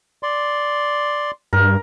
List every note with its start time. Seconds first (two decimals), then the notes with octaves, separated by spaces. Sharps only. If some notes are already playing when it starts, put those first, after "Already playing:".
0.23 D5 C6
1.53 G2 A#4